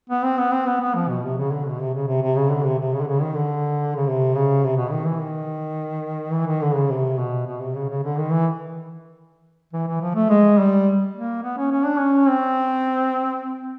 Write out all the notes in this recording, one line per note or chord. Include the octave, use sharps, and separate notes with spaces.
B3
C4
B3
C4
B3
B3
F3
B2
C3
C#3
D3
B2
C3
C#3
C3
C3
C#3
D3
C3
C3
C#3
D3
C#3
D#3
D3
C#3
C3
C#3
C3
B2
D#3
E3
D#3
E3
D#3
D3
C#3
C3
B2
B2
C3
C#3
C#3
D3
D#3
E3
E3
E3
F3
A3
G#3
G3
A#3
B3
C#4
C#4
D4
C#4
C4